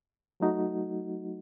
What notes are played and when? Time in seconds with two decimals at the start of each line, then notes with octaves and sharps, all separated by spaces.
0.40 F#3 A3 D#4 F#4